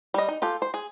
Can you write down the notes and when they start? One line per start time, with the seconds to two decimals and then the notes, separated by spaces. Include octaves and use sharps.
0.14 G3 D#5
0.28 D#4
0.42 F4 G4 A4
0.62 C5
0.74 G#4